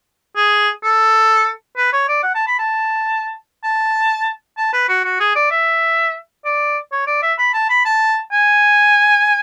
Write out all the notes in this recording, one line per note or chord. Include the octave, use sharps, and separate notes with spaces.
G#4
A4
B4
C#5
D5
F#5
A5
B5
A5
A5
A5
B4
F#4
F#4
G#4
D5
E5
D5
C#5
D5
E5
B5
A5
B5
A5
G#5